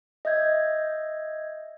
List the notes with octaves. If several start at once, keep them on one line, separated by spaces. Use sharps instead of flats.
D#5 E5 G6 G#6